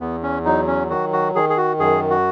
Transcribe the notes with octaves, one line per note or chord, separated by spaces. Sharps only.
E2 B3
C#4
F#3 D#4
C#4
D#3 F#4
F#4
D#3 G#4
G#4
F#4
F#2 G#4
F#4